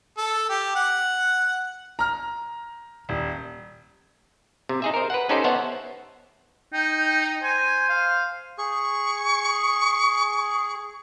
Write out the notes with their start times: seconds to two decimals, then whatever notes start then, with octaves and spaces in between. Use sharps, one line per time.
0.18 A4
0.49 G4
0.76 F#5
1.99 A#5 F6
3.09 D#1
4.69 C3
4.82 D#4 G#4 E5
4.94 A#4 C5
5.10 B4 F#5
5.29 C#4 D#4 G4 A4 C5
5.44 B3 C5 C#5 E5 F#5 A5
6.73 D#4 G5
7.43 C5 G#5
7.89 F5
8.58 G#4 C#6